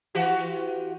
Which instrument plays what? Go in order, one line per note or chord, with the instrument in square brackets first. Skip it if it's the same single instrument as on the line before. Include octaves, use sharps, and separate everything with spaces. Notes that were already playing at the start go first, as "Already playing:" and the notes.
[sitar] E3 F#4 G4